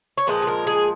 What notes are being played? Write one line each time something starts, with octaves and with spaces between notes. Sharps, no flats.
C#5
A#2 F3 G#3 B4
G#4
A#4
G#4